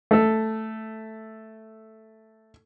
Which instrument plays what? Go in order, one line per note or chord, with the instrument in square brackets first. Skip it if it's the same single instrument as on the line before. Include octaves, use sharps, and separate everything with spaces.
[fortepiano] A3 A4